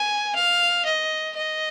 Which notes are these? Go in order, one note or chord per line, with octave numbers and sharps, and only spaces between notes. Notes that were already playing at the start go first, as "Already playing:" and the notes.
Already playing: G#5
F5
D#5
D#5